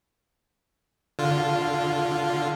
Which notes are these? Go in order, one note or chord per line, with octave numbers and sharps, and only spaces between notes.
D3 F4